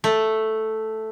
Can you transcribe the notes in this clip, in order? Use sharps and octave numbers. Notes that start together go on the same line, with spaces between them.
A3